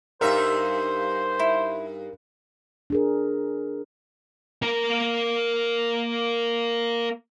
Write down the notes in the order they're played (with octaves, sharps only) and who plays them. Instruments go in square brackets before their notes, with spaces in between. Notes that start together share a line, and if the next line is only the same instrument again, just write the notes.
[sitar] G2 D#4 E5 [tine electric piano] A#4 [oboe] C5
[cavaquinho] E4
[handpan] D4 G#4 A#4
[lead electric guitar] A#3 A#4